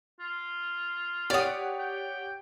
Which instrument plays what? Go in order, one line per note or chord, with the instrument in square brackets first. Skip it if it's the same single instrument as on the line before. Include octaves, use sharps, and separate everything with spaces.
[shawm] F4
[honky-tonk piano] G4 C#5 F#5 [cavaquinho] D5 D#6
[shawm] G5